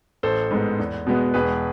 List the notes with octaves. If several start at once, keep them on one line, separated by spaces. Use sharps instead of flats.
A1 A4 C5
G#2 G#3 B3
E2
B2 G#3 B3
E1 G#4 B4